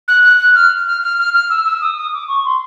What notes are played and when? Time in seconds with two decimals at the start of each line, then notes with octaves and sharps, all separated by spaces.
0.08 F#6
0.24 F#6
0.40 F#6
0.55 F6
0.87 F6
1.03 F6
1.19 F6
1.34 F6
1.50 E6
1.65 E6
1.81 D#6
1.96 D#6
2.13 D6
2.28 C#6
2.45 C6